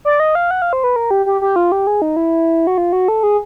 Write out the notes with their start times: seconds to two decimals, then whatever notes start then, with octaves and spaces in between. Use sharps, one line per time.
0.05 D5
0.20 D#5
0.35 F5
0.51 F#5
0.62 F5
0.73 C5
0.84 B4
0.96 A#4
1.11 G4
1.26 G4
1.41 G4
1.56 F4
1.72 G4
1.87 G#4
2.02 D#4
2.16 E4
2.67 F#4
2.78 F4
2.93 F#4
3.08 A4
3.23 G#4